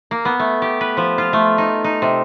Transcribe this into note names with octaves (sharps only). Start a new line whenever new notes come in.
A#3
B3
A3
G4
B4
F3
F4
A3
D#4
D#4
C3